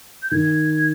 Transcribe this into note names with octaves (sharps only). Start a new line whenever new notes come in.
G6
D#3 G#6